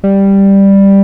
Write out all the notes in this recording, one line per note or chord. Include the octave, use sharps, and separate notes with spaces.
G3